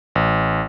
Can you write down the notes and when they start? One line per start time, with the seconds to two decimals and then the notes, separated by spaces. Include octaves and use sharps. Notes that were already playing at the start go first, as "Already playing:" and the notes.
0.15 A1